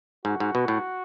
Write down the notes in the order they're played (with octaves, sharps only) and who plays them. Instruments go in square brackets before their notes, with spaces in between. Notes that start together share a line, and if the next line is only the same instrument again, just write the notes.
[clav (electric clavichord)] G#2 [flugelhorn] F#4
[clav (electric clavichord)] G#2
B2
A2